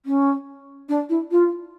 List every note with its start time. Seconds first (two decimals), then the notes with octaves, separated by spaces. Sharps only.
0.05 C#4
0.89 D4
1.09 E4
1.31 F4